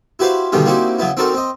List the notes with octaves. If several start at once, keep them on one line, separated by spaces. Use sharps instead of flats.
E4 F#4 G4 B4 C5 F5
G2 B2 D3 D#3 G3 C#4
A#3 C4 D#4 E4 F#4 G4
C#3 F#3 B3 E4
C4 D4 D#4 F#4 A4 A#4
C4 D#5